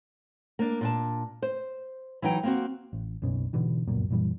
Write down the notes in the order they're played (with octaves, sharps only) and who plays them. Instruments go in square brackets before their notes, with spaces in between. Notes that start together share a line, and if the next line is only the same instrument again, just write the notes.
[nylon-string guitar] A#3 D4
A#2 D4 A5
C5
E3 F#3 D#4 G5
A#3 C4 F#4
[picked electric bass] A1
F#1 B1 B2 C#4
G#2 B2 D3 E3
G1 C#2 F#2 A#2
F#2 A#2 E3 G3